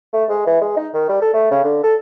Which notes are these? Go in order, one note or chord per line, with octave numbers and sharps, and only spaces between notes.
A3
G#3
E3
G#3
D#4
D#3
G3
A4
A3
C#3
D3
A4